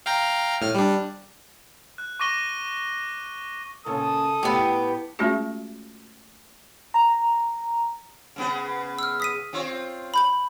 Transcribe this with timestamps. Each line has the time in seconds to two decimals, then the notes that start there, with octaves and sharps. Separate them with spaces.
0.06 F5 G5 A#5
0.61 A2 F6
0.74 G3 D4
1.98 F#6
2.20 C#6 D6 A#6 D#7 G7
3.86 A#2 C#3 A4 D#6
4.43 A2 B3 G4
5.19 G#3 A3 C#4 F4 F#4 G#4
6.94 A#5
8.36 C#3 B3 G#4
8.99 E6 F6
9.20 D#6 B6 D#7
9.53 C4 F4 C#5
10.14 B5 G6 F#7